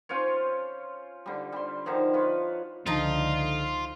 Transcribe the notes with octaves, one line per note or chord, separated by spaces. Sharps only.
C#4 F4 C5 C#5
D3 G3
G3 C6
D3 D#3 F3 C#5
F4 B4 C#5
C#2 D3 F3 D#4 F4